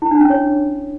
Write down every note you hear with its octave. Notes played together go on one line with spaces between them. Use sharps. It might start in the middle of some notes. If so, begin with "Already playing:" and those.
E4
D4
C#4
C#5